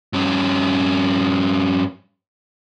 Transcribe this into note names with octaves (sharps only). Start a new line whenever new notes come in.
G2 C#4